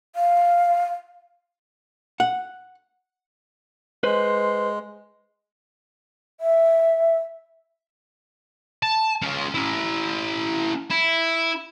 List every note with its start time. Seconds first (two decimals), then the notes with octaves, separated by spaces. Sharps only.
0.16 F5
2.20 F#5
4.03 G#3 B4 C5
6.41 E5
8.83 A5
9.22 C#4 F4
9.54 C#4 E4
10.91 E4